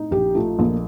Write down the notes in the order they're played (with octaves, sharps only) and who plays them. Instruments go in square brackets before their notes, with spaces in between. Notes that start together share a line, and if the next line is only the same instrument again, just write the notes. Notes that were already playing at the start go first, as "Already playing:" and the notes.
Already playing: [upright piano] A2 D#4
[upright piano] A#1 [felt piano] G4
[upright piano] A3 [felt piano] F4
[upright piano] A#1 [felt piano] A#3